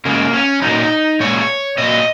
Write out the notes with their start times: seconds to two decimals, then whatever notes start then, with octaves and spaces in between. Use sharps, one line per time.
0.05 C#3 G#3 A#3
0.33 C#4
0.62 A#2 F#3 D#4
1.20 A#2 G#3 C#5
1.78 A#2 F#3 D#5